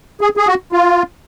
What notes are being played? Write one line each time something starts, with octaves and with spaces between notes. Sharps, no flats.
G#4
G#4
F#4
F4